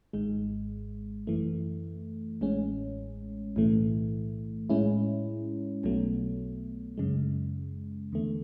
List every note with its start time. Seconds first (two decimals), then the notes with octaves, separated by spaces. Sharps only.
0.13 G#1 G#2 G#3
1.27 F#2 E3 A3
2.41 A1 A2 G#3 C#4
3.56 B1 A2 E3 A3
4.70 A2 G#3 C#4 E4
5.83 B1 B2 F#3 A3
6.97 F#2 C#3 G#3
8.13 E2 D3 A3